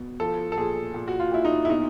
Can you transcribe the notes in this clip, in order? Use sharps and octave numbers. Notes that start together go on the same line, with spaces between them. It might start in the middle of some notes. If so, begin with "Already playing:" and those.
Already playing: B2
F3 A4
A4
A#2 G#4
A#2
F#4
F4
A#2 E4
D#4
E4
B2 D#4